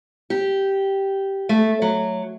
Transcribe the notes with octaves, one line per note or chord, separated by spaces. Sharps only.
G4
A3
F#3